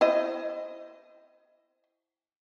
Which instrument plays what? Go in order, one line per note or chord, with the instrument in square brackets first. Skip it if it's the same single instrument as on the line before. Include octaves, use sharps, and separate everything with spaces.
[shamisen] E4 C5 D#5